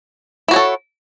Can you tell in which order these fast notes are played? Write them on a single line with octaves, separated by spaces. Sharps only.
E4 F#4 C#5 A4